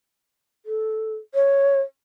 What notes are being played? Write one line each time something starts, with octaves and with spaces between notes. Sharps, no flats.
A4
C#5